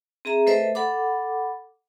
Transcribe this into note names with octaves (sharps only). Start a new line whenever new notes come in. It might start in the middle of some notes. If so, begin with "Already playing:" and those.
C4 G#4 E5 A#5
A3 A4 B4 C5 D#5 E5
A4 F#5 B5 D6